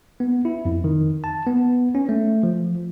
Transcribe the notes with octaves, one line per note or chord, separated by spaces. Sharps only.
B3
E4
F2
D#3
A5
B3
C#4
A3
F3